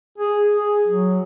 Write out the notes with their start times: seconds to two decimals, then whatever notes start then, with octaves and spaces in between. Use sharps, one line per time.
0.18 G#4
0.55 G#4
0.88 F#3